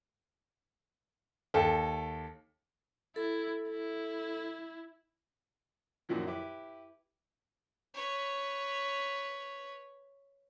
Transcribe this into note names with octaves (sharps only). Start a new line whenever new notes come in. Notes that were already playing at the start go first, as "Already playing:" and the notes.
D#2 A4 G5
E4 A4
E4
F#2 A#2 D#3 F3 F#3
E4 G4 B4
B4 C#5